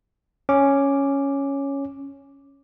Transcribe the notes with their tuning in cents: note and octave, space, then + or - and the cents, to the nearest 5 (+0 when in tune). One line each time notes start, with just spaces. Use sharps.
C#4 +0 D6 +0